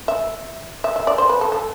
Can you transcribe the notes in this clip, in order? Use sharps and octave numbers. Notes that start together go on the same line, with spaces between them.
E5
E5
E5
D5
C5
B4
A4
A4